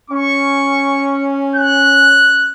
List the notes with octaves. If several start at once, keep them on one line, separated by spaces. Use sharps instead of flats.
C#4 C#6
F#6